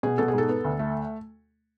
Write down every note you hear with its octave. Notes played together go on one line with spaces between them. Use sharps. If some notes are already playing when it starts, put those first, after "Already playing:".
B2 G#4
B2 A4
G#4
G#2 A4
B3
D2
A3